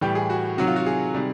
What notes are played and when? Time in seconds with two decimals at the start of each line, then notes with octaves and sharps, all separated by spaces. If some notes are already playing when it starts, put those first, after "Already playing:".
0.01 A2 E3 G3 G4
0.15 G#4
0.30 F#4
0.58 C3 D#3 F#3 F#4
0.67 F4
0.76 F#4
0.86 G#4
1.14 C3 D#3 G3